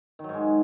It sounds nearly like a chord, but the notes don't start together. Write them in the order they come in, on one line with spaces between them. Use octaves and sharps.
D#3 F#3 G#2 G#3